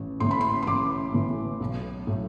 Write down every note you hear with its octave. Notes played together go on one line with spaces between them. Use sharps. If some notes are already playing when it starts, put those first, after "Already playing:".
Already playing: A1
A2 E3 C6
B5
C6
C6
A1 D6
A2 E3
B1
A2 F#3